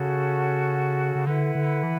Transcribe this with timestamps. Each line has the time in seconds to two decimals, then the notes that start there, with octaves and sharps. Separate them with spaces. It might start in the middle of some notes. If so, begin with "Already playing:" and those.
Already playing: C#3 C#4 F#4 A4
1.16 C#3
1.27 D3 E4 B4 F#5
1.55 D3
1.83 E3